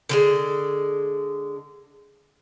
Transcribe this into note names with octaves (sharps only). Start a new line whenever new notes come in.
D3 F3 G#3